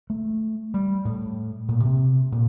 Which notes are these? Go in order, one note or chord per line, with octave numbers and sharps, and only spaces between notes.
A3
G3
A2
A#2
C3
A#2